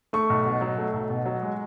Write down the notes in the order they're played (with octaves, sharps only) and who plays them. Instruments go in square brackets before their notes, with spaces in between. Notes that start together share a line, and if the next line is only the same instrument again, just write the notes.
[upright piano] A3 C#6
B1
B2
F#3
A3
B1
B2
F#3
G#3